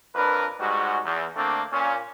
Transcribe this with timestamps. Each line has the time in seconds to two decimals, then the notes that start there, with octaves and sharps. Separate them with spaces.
0.15 F2 D4 A#4 B4
0.60 G#2 G3 G#3 F#4
1.05 E2
1.35 D3 A3 A#3 C4 D4
1.72 A#2 C#4